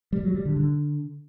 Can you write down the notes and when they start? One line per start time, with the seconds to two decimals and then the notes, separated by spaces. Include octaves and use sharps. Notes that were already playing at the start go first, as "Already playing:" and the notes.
0.13 G3
0.23 F#3
0.34 G3
0.45 D3
0.56 D3